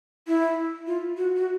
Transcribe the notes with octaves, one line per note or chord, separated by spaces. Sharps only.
E4
F4
F#4
F#4